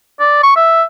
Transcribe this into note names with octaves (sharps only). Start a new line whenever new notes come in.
D5
C#6
E5